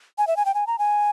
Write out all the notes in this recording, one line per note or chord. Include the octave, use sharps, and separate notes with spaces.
G#5
E5
G#5
G5
G#5
A#5
G#5